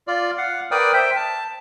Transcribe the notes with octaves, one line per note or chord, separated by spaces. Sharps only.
F4 D5
F5 F#5
A#4 B4 D5 G5 D#6
C5 E5 G5
A5